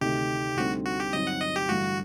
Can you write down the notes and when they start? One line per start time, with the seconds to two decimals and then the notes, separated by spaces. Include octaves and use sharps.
0.01 D2 C3 D#3 A3 D#4 G4
0.57 D2 D3 G3 C4 D#4 F#4
0.85 F#4
1.00 G4
1.13 G1 G2 F#3 C4 D#4 D#5
1.27 F#5
1.41 D#5
1.56 G4
1.69 A1 G2 D3 F#4